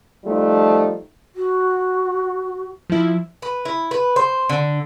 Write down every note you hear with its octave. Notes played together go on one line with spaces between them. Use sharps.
F3 G3 A3 D#4 F4
F#4
F3 E4
B4
E4
B4
C5
D3